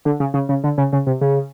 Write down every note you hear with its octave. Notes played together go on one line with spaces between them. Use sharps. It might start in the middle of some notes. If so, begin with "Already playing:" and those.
D3
C#3
C#3
C#3
D3
C#3
C#3
C3
C#3